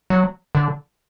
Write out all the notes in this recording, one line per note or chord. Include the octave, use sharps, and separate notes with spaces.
F#3
D3